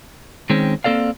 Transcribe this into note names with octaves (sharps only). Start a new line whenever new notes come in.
D#3 G#3 C4 C#4
A#3 C4 A4 D5 F5